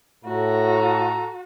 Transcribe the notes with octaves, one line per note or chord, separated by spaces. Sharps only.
A2 F#4 A4 A#5